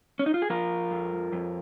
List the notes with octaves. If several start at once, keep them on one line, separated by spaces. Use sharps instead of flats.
C#4
D#4
F4
G#4
F3 F4 A#4
F2
F2